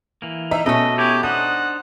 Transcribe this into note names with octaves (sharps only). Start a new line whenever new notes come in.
E3 A#3
D#4 E5
B2 A3 B3 C#4 D#5
E4 G4 G#4 C#5
D4 D#4 C5 F#5 D#6